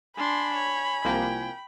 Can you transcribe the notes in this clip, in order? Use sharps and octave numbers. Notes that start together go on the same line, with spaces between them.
D4 G#5 B5 C6
C#5
C2 F3 A#3 G5